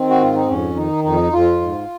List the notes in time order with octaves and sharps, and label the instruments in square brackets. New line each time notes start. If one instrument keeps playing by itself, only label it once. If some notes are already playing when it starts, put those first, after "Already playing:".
Already playing: [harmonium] D#3 C4
F#4
G#2 F4
D#4
F2 C#4
D#3 D#4
F2 D#4
F2 F4
G#2